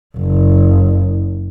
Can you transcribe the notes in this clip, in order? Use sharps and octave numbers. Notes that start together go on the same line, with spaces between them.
F#1